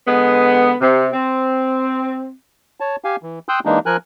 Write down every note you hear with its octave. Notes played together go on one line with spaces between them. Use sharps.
D3 G#3 B3
C3
C4
C#5 A5
G4 F5 G#5
E3
G5 C6 D#6 E6 F#6 G6
E3 G#3 A#3 D4 D#4
F3 A#4 G#5 F#6